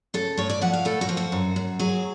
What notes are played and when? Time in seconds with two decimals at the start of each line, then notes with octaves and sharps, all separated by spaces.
0.14 C#3 A4
0.37 A2 C#5
0.50 D5
0.61 F3 F#5
0.73 F5
0.85 A2 A4
1.01 F#4
1.09 F3
1.17 F#4
1.32 F#2
1.56 F#2
1.79 F#3 G#4